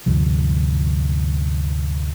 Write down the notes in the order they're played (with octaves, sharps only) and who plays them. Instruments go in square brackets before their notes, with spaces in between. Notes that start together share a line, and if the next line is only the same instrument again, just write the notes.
[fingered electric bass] D2 G2 C3 F3